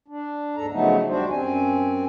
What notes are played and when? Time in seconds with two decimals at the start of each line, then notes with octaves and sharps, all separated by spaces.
0.08 D4
0.56 D#2 G#2 A4 A#5
0.71 C#3 F3 F#3 A3 B3 D#4
1.07 D#2 G3 D4 F#4 C5
1.31 F#2 C4 G#5